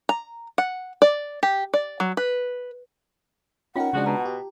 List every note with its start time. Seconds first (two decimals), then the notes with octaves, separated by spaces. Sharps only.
0.09 A#5
0.58 F#5
1.02 D5
1.43 G4
1.74 D5
2.00 F#3
2.17 B4
3.76 C#4 D#4 F4 A#4 F#5 G5
3.93 C#3 F3 G#3 D4 F#4
4.06 B2 A5 A#5
4.25 G4